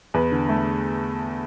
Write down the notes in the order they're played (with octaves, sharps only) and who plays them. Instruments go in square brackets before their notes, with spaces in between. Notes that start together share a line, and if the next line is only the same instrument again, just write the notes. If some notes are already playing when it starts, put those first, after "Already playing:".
[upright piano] E2 B4
D3
A3